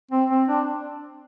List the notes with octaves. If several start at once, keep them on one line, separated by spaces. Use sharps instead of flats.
C4
C4
D4